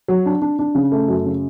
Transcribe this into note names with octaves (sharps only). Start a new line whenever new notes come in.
F#3
D4
D4
D4
C#3
A3
F#2
C#3